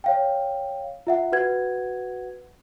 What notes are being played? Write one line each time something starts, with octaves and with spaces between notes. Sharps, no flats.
C#5 F5 G5
F4 E5 F#5
F#4 B4 F#5 G#6